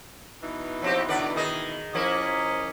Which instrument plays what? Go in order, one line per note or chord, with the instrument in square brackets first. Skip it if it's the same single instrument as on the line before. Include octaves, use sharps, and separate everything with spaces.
[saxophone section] B2 E3 D#4
[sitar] F3 C4 G4
D3 B4 D5
D#3 G#4 D#5
[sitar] F3 A#3 E4 [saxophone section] C#4 D#5